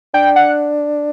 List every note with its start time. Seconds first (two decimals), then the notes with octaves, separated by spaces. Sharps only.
0.14 D4 G5
0.36 F#5